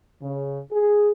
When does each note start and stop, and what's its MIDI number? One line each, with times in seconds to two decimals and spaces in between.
0.22 0.60 49
0.72 1.11 68